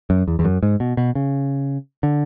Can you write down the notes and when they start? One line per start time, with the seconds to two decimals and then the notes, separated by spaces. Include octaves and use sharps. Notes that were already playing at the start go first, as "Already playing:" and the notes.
0.10 F#2
0.28 E2
0.39 E2
0.45 F#2
0.63 G#2
0.80 B2
0.97 B2
1.15 C#3
2.03 D3